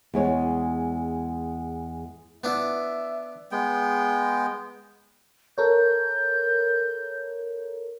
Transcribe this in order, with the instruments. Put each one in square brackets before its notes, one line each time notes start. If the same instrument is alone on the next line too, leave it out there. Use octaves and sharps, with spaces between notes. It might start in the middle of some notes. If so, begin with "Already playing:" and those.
[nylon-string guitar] E2 G#3 C#5
[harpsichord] B3 D4 E4 [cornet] E5
[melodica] G#3 B3 G5
[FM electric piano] A4 A#4 C#5 [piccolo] G6